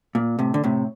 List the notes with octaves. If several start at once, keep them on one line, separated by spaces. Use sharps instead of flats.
A#2
A2 C3
D3
A2 C3